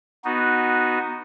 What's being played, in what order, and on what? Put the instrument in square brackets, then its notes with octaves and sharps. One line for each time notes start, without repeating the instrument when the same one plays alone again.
[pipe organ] B3 D#4 F#4